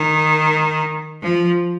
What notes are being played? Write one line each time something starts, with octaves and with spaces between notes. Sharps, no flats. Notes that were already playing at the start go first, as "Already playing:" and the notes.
Already playing: D#3
F3